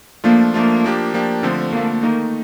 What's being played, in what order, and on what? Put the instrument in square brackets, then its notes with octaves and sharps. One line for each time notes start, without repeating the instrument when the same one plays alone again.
[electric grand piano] F3 A3 D4 F4 [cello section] A#3
[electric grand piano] F3 A3 D4 F4 [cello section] A#3
[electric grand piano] F3 A#3 D4 G4
F3 A#3 D4 G4
[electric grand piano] D3 F3 A3 [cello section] C4
[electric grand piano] D3 F3 A3 [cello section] A#3
[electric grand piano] D#3 A3 D#4 [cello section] A#3